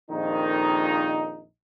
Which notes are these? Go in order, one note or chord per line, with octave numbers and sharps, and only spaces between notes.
A#1 F2 D#3 D#4